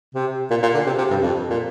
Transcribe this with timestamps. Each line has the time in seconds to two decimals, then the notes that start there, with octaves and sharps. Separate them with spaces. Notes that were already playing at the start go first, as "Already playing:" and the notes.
0.15 C3
0.51 A#2
0.62 A#2
0.74 D3
0.87 C3
0.98 C3
1.10 G2
1.22 F2
1.50 A#2